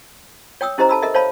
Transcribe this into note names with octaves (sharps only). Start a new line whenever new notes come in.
C#5 G5 D#6 E6
C#4 E4 G4 C5 D#5 A#5
A4 A5 B5 E6
A4 A#4 D#5 E5
C5 C#5 F5 A5 B5